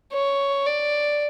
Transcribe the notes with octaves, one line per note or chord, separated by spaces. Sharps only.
C#5
D5